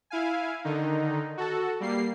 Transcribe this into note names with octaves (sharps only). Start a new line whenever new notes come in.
E4 F5 G#5
D3 D#3 D#4
F#4 A4
G3 A#3 C7